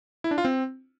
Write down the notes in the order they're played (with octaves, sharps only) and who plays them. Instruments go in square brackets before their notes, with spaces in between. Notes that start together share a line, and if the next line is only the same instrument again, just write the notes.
[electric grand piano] E4
D4
F4
C4